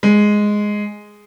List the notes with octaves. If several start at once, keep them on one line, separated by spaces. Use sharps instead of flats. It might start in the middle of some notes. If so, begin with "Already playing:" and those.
G#3